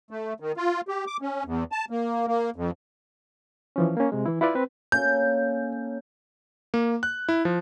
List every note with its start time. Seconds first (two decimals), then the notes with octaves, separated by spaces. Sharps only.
0.11 A3
0.40 D#3
0.57 F4
0.88 G4
1.07 D6
1.22 C#4
1.45 E2
1.72 A5
1.90 A#3
2.27 A#3
2.56 F2
3.76 E3 F3 C#4
3.97 A#3 C#4
4.12 C3 G#3
4.26 E3 E4
4.41 E4 F4 B4 D5
4.55 C4 B4
4.92 A#3 C#4 A4 G6
6.74 A#3
7.03 F#6
7.29 E4
7.45 F3